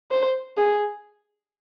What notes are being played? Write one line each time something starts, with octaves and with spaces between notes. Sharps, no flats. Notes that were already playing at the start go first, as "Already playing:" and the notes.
C5
G#4